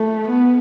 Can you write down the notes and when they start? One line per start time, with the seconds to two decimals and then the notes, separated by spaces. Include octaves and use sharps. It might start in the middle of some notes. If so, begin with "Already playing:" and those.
Already playing: A3
0.29 B3